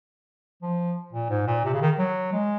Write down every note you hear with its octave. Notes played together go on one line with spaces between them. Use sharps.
F3
A#2
G#2
A#2
C3
C#3
D#3
F#3
G#3